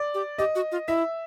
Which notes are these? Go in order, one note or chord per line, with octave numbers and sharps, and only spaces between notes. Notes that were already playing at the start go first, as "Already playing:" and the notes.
Already playing: D5
G4
G4 D#5
F#4
F4
E4 E5